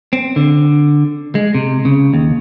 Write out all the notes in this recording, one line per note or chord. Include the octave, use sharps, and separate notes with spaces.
C4
D3
G#3
C3
C#3
D#2